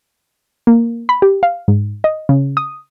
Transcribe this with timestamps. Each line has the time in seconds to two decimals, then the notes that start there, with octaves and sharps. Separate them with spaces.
0.67 A#3
1.09 B5
1.22 G4
1.43 F5
1.68 G#2
2.04 D#5
2.29 C#3
2.57 D#6